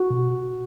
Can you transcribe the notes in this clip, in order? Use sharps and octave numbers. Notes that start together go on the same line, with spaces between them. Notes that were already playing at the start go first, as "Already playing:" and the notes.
Already playing: F#4
B2